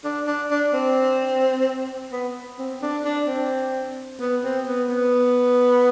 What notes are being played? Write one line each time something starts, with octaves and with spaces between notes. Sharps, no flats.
D4
D4
D4
C4
B3
C4
D4
D4
C4
B3
C4
B3
B3